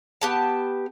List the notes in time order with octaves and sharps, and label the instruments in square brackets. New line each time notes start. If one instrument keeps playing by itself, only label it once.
[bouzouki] B3 G4 A5